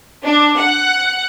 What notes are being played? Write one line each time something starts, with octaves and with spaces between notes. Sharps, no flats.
D4
F#5